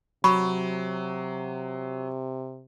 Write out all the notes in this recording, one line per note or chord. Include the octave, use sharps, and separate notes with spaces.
C3 F#3 B5 C#6